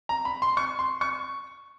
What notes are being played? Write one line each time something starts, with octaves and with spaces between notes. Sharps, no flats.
A#5
B5
C6
C#6
C6
C#6